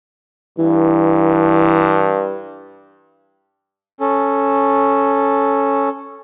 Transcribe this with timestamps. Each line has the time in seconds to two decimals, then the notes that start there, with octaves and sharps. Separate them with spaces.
0.59 G2 E3
4.00 C#4 A4